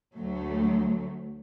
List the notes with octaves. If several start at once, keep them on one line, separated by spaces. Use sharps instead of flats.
D2 F#3 A3